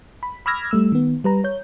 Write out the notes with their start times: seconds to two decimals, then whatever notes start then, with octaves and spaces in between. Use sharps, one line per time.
0.23 B5
0.46 B5 D6 E6 F6 G#6 A#6
0.71 G3 A3 E6
0.92 D#3 B3
1.24 G3 B4 A#5
1.44 C#5 G6